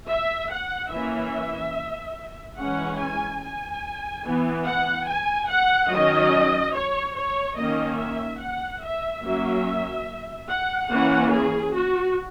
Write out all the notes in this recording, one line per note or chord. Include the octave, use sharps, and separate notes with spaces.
E5
F#5
E3 A#3 C#4 E5
E3 G#3 C#4 F#5
G#5
G#5
E3 B3
F#5
G#5
F#5
D#3 F#3 C#4 D#5
C#5
C#5
D#3 A#3 C#4 D#5
E5
F#5
E5
F#3 A#3 C#4 E5
F#5
E3 A#3 C#4 F#5
G#4
F#4